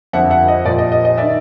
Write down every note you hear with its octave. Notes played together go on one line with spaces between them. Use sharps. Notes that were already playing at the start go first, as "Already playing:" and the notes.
F2 D3 F3 E5 F#5
E5 F#5
D#5
A#2 F3 D5
D#5
D#5
D#5
D#3 D5 E5